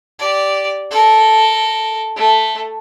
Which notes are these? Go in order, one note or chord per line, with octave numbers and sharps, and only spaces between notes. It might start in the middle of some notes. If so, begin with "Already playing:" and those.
G4 D5
A4 A#4
A3